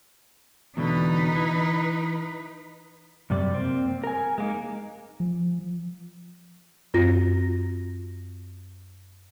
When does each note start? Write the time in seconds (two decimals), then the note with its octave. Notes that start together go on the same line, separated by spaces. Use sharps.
0.77 E2 B2 D3 D#4 B4
1.36 E3
3.30 F#2 C3 G3 D5
3.53 A#3 C4
4.04 A#4 G#5
4.38 G#3 A#3 D#4
5.20 F3
6.94 F#2 C4 F4 A#6